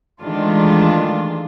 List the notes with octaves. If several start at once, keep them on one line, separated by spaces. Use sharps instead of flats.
D#3 E3 G#3 A3 D4 F4